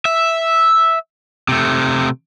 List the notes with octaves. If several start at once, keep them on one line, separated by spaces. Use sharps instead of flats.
E5
C3 A3